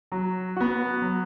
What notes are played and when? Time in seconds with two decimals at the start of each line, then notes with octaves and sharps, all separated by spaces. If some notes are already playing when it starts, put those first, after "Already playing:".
0.12 F#3
0.56 B3 F#4
1.02 F#3